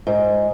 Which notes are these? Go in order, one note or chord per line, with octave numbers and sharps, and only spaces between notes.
G#2